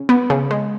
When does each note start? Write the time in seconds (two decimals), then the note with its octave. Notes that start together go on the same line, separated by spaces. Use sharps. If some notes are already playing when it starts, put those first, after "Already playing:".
Already playing: C#3
0.09 B3
0.30 C#3
0.51 G#3